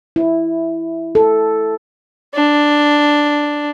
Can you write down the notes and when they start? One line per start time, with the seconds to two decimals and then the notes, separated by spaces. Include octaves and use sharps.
0.16 E4
1.15 A4
2.34 D4